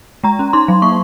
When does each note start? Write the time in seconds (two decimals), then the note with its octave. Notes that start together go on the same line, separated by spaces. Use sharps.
0.24 G#3 A#5
0.39 C#4
0.53 D#4 C6
0.68 F#3
0.82 A#3 C#6